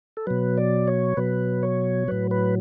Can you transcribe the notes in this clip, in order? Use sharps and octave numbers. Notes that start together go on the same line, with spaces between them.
A4
B2 F#3 B4
D5
C#5
B2 F#3 B4
C#5
A2 F#3 B4
B4